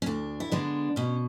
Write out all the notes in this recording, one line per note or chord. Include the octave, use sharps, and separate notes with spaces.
C#4
D2 D4
E4
D3 G#3 B3 D4
B2 C#4